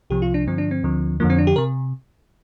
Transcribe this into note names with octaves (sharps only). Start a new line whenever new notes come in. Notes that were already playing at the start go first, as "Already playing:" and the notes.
C2 C3 F3 G4
F4
D4
G2 D3 F3 C4
D4
C4
D2 D3 F3
F2 D3 F3 A#3
C4
D4
G4
C3 A#4